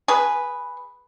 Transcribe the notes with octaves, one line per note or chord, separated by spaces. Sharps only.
G#4 B4